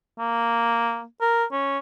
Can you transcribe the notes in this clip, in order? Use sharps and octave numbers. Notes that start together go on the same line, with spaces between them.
A#3
A#4
C#4